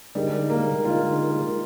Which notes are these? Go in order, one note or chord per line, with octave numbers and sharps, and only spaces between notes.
D3 G3 G#3 D#4 A#4
A#3
D3 G#3 D#4 F4 A#4